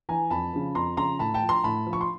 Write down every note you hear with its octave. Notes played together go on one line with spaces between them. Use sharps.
E3 G#5 A#5
F2 A5 B5
C#3 F3
F2 A#5 C6
C#3 F3 A#5 C6
A2 A5 B5
G5 A5
F3
A#5 C6
A2 A5 B5
F3
C#6
C6